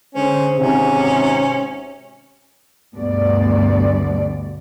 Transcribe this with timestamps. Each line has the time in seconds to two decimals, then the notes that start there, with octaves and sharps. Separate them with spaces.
0.15 D3 G#3 C#4 C5
0.58 G#1 G#2 C3 C#4
2.95 D2 G2 B2 D5